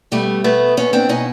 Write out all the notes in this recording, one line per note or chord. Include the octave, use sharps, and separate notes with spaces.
B2 G3 A3
B2 A3 B3
B2 B3 C#4
C4 D4
B2 C#4 D#4